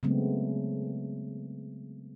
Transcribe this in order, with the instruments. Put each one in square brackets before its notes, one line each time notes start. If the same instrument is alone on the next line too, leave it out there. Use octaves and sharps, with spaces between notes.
[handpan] C#3 F#3 G#3 A3 B3 C4